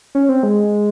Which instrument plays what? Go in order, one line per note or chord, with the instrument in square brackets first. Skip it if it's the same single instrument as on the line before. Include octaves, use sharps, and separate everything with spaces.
[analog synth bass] C#4
C4
G#3